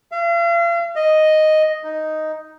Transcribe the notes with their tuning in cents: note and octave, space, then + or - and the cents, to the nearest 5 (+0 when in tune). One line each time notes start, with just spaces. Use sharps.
F5 -40
D#5 +0
D#4 +0